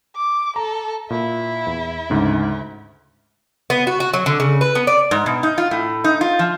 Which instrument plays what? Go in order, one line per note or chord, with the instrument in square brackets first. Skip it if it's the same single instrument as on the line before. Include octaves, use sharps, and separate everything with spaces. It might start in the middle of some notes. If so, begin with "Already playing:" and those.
[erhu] D6
[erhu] A4 [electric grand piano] A#5
[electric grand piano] A#2 [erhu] E4
[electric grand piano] E2
D2 G#2 C#3
[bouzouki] B3
F#4
F#4
F#3
D3
C#3
B4
B3
D5
[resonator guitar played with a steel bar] G#2
B2
D#4
F4
A2
D#4
F4
F3